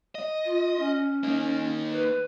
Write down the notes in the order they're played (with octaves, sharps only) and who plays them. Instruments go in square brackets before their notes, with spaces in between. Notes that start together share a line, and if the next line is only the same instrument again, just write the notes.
[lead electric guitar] D#5
[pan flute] F4
C#4
[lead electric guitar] A#3 D#4
[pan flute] B4